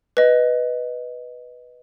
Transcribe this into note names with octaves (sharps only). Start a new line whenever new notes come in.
B4 D#5